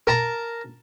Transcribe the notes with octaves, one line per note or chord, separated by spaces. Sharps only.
A#4 A5 A#5